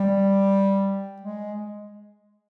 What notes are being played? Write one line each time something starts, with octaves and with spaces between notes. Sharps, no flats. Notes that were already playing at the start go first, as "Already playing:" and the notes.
Already playing: G3
G#3